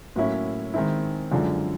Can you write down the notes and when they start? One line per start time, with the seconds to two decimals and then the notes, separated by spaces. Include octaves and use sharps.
0.16 A2 F#3 A#3 C#4 E4
0.74 D#3 G#3 C4 E4
1.32 F#2 D3 F3 G#3